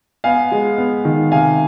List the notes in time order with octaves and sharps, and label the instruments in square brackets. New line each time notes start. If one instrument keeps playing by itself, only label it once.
[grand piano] B3 F5 G#5
G#3
B3
D#3
C3 F5 G#5